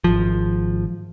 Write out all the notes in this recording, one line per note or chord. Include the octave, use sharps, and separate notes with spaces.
G#1 F3